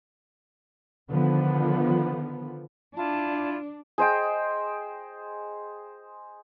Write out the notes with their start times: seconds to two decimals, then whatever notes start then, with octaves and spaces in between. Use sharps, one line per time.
1.08 D3 D#3 F3 B3
2.96 D4 E4 F4 A5
3.98 G#4 C5 D#5 G5